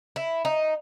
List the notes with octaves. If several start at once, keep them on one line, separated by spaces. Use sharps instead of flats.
E4
D#4